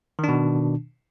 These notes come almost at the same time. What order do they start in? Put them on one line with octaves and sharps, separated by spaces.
D#3 D4 B2